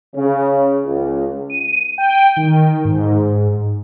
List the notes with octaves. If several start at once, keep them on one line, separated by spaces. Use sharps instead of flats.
C#3
C#2
D#7
G5
D#3
G#2